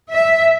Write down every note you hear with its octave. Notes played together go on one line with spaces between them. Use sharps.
E5